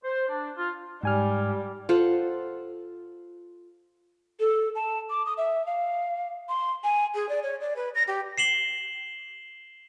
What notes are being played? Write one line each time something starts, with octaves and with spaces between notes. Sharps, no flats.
C5
D4
F4
G#2 G3 G#5 F6
F4 A4 C5 F#5
A4
A5
D6
D#6
E5
F5
C6
G#5
G#4
D5
C#5
D5
B4
A#6
G4
C7 E7 F#7 G7